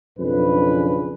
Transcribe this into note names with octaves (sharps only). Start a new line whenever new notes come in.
B1 F2 C#3 D4 B4